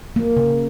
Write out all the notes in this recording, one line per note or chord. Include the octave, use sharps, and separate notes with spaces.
A#3
C#3